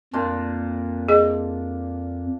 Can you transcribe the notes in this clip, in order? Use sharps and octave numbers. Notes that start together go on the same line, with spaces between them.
F2 A#2 D4 F4
G#4 D#5